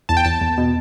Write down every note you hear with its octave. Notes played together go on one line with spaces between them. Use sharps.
E2 A5
G5
E2 A5
E2
B2